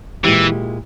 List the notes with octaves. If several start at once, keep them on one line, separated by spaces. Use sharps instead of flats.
A#2 E3 G#3 E4 G4